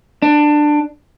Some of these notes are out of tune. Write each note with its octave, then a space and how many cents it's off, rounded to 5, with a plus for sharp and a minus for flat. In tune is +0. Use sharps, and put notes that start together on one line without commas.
D4 +15